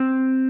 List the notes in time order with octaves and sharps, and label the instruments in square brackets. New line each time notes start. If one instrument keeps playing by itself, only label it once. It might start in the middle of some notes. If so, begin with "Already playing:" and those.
Already playing: [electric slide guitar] C4